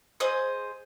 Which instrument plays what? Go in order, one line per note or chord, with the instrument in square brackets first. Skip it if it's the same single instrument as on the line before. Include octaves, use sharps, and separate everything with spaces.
[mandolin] G#4 C5 D#5 D#6